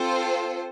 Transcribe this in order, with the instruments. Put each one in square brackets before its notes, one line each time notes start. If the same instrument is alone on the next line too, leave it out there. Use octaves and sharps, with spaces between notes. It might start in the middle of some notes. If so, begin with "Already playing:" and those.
Already playing: [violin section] C4 F4 A4 C5